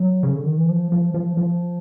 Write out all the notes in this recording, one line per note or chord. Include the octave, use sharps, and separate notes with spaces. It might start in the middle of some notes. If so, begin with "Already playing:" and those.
Already playing: F#3
C#3
D3
D#3
E3
F3
F3
F3
F3